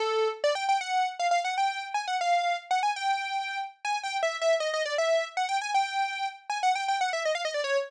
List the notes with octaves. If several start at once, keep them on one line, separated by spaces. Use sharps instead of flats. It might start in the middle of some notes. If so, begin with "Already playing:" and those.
Already playing: A4
D5
G5
G5
F#5
F5
F5
F#5
G5
G#5
F#5
F5
F#5
G#5
G5
G#5
G5
E5
E5
D#5
D#5
D5
E5
F#5
G5
G#5
G5
G#5
F#5
G5
G5
F#5
E5
D#5
F5
D#5
D5
C#5